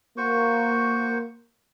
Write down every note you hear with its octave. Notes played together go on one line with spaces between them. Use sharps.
A#3 F#4 C5 C#6